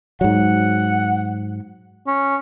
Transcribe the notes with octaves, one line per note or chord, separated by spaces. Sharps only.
G#2 F#3 F#5
C#4